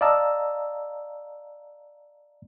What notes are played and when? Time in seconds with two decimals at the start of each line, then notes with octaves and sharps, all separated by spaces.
0.01 D5 D#5 F5 A5 A#5 E6